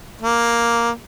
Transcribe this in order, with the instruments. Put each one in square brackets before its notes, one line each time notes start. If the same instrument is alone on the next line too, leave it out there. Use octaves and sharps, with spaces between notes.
[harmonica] A#3